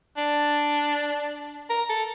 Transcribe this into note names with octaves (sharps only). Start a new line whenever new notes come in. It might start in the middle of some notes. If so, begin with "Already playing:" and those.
D4
A#4
A4